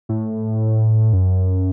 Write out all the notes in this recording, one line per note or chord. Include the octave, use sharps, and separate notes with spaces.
A2
F#2